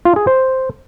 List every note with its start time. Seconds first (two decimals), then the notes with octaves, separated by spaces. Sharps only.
0.05 F4
0.16 G#4
0.27 C5